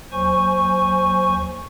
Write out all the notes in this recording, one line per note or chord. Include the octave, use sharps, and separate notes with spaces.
D#2 F#3 C5 G#5 C#6